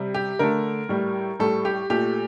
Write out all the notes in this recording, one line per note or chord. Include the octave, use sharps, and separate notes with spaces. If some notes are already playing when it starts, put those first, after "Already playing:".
Already playing: C3 G3
G4
D3 A3 A#4
A2 G3
A2 G3 A4
G4
A#2 A3 G4